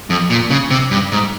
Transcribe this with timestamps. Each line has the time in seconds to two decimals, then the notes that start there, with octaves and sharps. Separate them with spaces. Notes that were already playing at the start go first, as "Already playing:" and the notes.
0.10 F2
0.30 A#2
0.50 C#3
0.71 C3
0.91 G2
1.12 G#2